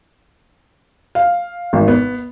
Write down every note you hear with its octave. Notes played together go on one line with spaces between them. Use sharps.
F5
G#1
B3